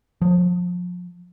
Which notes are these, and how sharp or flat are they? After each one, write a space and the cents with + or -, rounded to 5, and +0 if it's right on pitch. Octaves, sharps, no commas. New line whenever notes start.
F3 +35